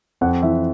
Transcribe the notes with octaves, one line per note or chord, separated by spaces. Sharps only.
F2 F#5
E3 E5